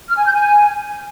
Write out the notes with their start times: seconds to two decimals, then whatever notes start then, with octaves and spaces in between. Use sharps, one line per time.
0.09 F6
0.18 G#5
0.26 G6
0.34 G#5